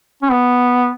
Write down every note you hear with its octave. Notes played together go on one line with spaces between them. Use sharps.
C#4
B3